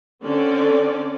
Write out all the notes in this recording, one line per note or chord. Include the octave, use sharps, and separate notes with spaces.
D3 C4 C#4 D5